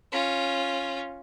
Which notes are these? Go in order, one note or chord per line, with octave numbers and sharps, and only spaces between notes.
C#4 F4